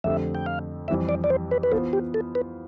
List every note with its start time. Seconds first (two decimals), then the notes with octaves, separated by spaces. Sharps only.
0.04 F2 D3 A3 C4 G4 E5
0.35 G5
0.46 F5
0.88 F2 E3 G3 C4 E5
1.09 D5
1.24 D5
1.30 C5
1.51 B4
1.63 B4
1.72 E3 B3 F4 A4 C5
1.93 G4
2.14 A4
2.35 B4